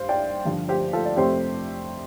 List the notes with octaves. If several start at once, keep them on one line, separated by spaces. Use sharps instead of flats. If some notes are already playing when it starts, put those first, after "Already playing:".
Already playing: G2 C5 F5
D5 G5
G2 D3 F3
G4 C5
F4 A4
D5
F2 C3 A3 G4 C5